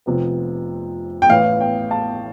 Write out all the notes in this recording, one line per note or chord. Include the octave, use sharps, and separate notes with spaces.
F1 F2 C3 F3 B3
G5
A1 A2 E3 B3 F5
G5
F5 A5